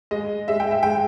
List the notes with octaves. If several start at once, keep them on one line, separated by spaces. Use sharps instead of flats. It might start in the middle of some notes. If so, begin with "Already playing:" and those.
G#3 D#5
G#3 E5
G5
E5
G#3 G5